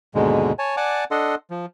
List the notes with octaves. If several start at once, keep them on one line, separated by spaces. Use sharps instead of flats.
D#2 G#2 B2 D3 G#3
C#5 G#5 A5
D5 F#5 G#5 A5 D6
D4 A4 D#5 F#5 C6
F3